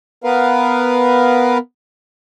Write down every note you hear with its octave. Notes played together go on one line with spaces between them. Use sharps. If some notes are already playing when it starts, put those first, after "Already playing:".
B3 A#4 B4 F5